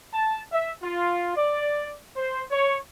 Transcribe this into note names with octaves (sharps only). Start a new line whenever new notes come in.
A5
E5
F4
D5
C5
C#5